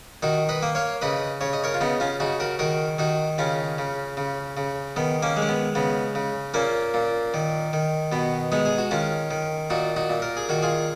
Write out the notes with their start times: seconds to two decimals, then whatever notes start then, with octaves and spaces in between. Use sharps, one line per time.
0.22 D#3 D#4 F#4
0.49 B4 D#5
0.62 A#3
0.75 C#5 F5
1.02 C#3 B4 D#5
1.41 C#3 C#5
1.53 D#5
1.64 A#4 C#5
1.74 F4
1.81 C#3 B3 D#4
2.00 C#4 F4
2.20 C#3 D#4 F#4
2.40 F#4 A#4
2.59 D#3 F#4 A#4
2.98 D#3 D#4 F#4
3.38 C#3 C#4 F4
3.78 C#3
4.17 C#3
4.57 C#3
4.96 D#3 B3
5.22 A#3 C#4
5.37 G#3
5.42 C#4
5.49 B3
5.75 C#3 B3
6.15 C#3
6.54 A#2 A#3 C#4
6.94 A#2
7.34 D#3
7.73 D#3
8.12 B2 B3
8.52 G#3 B3 D#4
8.65 G#4
8.78 F#4
8.91 D#3 C#4 F4
9.31 D#3
9.70 A#2 D#4 F#4
9.96 D#4 F#4
10.10 A#2
10.22 A#4
10.37 G#4
10.49 D#3 F#4
10.63 F4 G#4